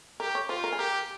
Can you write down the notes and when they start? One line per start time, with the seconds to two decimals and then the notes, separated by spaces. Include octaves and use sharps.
0.20 G4 A#4
0.35 C#5
0.49 F4 C5
0.64 A#4
0.72 G#4
0.79 G4 A#4